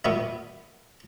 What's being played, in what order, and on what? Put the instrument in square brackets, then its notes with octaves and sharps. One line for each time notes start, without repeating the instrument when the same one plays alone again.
[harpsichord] A#2 B3 E4